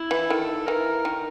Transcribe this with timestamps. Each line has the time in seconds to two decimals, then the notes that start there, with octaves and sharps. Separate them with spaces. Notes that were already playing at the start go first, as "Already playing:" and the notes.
Already playing: E4
0.11 E3
0.30 D#3 A4
0.67 E3 A#4
1.05 D#3